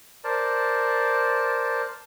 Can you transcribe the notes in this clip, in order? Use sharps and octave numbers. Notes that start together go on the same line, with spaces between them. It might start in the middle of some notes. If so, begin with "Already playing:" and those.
A#4 C5 D5 A5